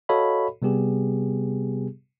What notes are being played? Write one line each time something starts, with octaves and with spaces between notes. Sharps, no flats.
F#4 A4 C#5 D#5 F5 B5
C3 G3 B3 G4 G#4